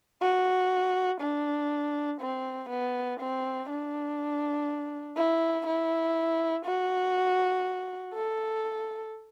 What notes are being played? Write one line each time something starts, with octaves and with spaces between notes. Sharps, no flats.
F#4
D4
C4
B3
C4
D4
E4
E4
F#4
A4